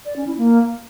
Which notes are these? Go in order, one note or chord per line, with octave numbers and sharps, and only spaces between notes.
D5
C#4
E4
A#3